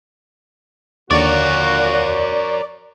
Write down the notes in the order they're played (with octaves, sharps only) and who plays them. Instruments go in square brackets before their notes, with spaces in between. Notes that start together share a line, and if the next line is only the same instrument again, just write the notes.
[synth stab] D#2 D3 C#6 [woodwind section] A#2 F#4 [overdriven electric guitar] A#4 C#5 [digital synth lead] D5